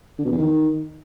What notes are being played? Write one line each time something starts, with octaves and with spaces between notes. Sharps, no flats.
D3
B2
E2
D#3